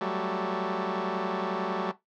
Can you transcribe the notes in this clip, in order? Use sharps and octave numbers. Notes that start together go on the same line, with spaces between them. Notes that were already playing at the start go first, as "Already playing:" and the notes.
F#3 G3 A3